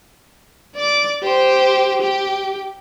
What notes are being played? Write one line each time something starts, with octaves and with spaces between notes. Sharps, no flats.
D5 D6
G4 C5
G4